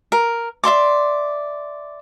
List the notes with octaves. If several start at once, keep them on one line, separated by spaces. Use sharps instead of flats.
A#4
D5 E5 C6 D6